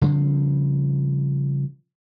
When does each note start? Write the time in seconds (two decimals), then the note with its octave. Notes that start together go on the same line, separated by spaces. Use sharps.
0.02 C#3 F3 G3 C4